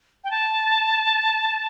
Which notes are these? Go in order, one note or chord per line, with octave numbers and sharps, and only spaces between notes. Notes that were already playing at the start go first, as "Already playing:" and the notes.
G5
A5